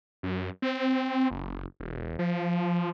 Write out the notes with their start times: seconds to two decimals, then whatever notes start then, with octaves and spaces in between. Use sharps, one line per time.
0.23 F#2
0.62 C4
1.31 F#1
1.80 E1
2.19 F3